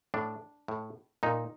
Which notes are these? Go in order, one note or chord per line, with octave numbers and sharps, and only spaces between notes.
A2 D4
A2
A#2 D#4